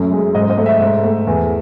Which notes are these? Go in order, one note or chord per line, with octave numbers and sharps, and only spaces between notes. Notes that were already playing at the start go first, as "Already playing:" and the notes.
Already playing: F#2 A3
G#3
G#2 D#5
D#5
A3
E5
G#2
A3
E2